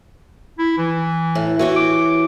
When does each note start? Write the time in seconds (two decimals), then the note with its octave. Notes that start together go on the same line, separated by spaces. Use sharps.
0.59 E4
0.78 E3
1.35 A2
1.59 E3 F#4 G4 C#5
1.76 D6